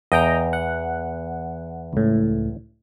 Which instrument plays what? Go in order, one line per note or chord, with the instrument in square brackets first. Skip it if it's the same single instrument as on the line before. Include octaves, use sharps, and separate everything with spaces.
[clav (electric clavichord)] E2 [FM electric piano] D#5 G5 A#5
[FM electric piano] F#5
C#2 A2